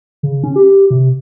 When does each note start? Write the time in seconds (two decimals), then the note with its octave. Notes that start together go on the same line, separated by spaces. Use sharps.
0.23 C#3
0.44 C#4
0.56 G4
0.90 C3